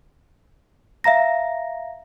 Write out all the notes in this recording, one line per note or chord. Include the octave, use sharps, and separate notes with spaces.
E5 F5 A#5 A#6